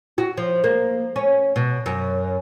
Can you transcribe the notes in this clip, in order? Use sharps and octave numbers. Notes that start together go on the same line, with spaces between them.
F#4
F3
A#3
C#4
B2
F#2